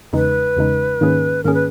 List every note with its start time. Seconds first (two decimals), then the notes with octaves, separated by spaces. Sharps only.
0.13 E2 C#3 G#3 D#4 B4
0.57 E2 C#3 G#3 D#4
1.01 G#2 D#3 A#3 C#4 G#4
1.44 G#2 D#3 A#3 C#4 G#4 A#4
1.54 B4